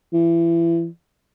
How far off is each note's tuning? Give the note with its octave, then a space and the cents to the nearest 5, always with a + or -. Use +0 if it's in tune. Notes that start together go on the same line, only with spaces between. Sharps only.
E3 +30